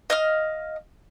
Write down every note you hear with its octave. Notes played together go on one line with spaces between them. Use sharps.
D#5 F5 F6